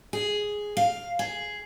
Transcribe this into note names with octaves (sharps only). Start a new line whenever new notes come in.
G#4
F5
G#4